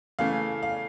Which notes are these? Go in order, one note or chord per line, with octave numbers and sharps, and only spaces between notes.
C#3 E3 A3 F5
F5